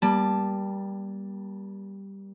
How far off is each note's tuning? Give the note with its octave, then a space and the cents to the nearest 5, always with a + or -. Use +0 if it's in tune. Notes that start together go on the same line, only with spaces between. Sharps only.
G3 +0 A#3 +40 A5 +0